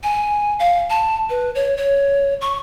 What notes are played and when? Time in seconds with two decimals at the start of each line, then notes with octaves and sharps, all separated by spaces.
0.03 G#5
0.60 F5
0.90 A5
1.30 B4
1.55 C#5
1.77 C#5
2.41 C#6